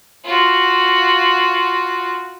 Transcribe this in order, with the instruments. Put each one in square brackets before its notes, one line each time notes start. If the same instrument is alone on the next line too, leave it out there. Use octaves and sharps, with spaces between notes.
[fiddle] F4 F#4